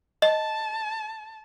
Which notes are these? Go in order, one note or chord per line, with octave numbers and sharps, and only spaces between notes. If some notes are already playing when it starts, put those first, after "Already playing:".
D#5 A5